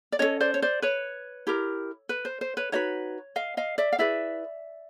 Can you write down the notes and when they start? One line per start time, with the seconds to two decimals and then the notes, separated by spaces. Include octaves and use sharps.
0.12 D5
0.19 C#4 F4 A4 C#5 D#5
0.40 C5 D5
0.54 C#5
0.62 C5 D5
0.82 B4 C#5
1.47 E4 G4 A#4
2.09 B4
2.25 C5
2.41 C5
2.57 B4 C#5
2.72 D#4 F#4 B4 C#5 D#5
3.36 D#5 F5
3.57 D#5 F5
3.78 D5 E5
3.92 F5
3.98 E4 G#4 B4 D5 E5